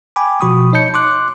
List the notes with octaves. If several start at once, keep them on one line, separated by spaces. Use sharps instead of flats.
G5 G#5 B5 D6
B2 F3 F#4 B5 C#6 D#6
D#4 C#5 D#5 A5 G6 C#7
C6 D6 F#6